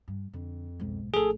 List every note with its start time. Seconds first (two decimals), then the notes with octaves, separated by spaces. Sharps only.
0.08 G2
0.33 F2 D3
0.80 B1 G#2
1.14 A#1 A2 G#4 A4